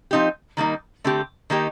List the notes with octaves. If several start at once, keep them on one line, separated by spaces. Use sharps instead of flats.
F3 C4 D#4 G4
D#3 G3 A#3 D#4
D3 A3 C4 G4
D#3 A#3 D#4 G4